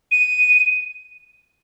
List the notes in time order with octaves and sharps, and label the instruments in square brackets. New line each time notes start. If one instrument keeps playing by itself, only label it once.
[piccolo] D#7